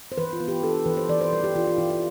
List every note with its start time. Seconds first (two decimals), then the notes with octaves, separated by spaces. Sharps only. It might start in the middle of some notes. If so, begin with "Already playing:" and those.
0.12 C5
0.18 E3 B4
0.33 F4
0.40 B3
0.48 G4
0.63 D4 A4
0.86 E3 B4
0.97 C5
1.09 E3 D5
1.21 C5
1.33 G3 B4
1.44 G4
1.55 E3 F4
1.67 F4
1.78 E3 E4
1.90 F4